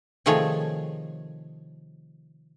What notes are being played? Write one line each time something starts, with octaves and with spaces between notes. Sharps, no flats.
C3 D#3 F3 A3 G#4 C#5